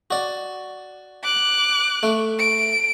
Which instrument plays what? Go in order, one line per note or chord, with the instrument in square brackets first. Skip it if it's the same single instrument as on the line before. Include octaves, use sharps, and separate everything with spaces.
[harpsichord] F#4 D5
[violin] D6 F#6
[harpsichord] A3
[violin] D7